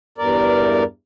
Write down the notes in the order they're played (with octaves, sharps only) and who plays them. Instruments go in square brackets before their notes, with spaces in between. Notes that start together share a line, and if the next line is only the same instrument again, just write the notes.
[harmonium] E2 G2 A#4 D5